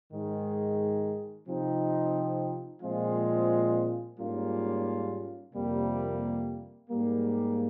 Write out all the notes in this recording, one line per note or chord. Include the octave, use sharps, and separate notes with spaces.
G#2 D#3 G#3
C3 F3 C4 D#4
A#2 F3 G#3 C4 F4
G#2 G3 A#3 C#4 F4
F2 C3 G3 A#3
G#2 G3 A#3